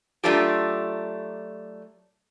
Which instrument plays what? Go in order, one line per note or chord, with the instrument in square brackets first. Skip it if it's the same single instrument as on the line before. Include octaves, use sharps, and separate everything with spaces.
[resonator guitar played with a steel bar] F#3 A3 D4 F4 G4